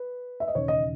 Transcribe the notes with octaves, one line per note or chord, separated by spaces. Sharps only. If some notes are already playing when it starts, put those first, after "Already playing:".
Already playing: B4
E5
D#5
E1 D#2 C#3 C#5
D#5